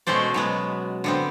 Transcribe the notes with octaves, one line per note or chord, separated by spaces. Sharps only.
B2 G#3 A3 C#4 C5 D5
F#3 G#3 B3
D3 B3 C4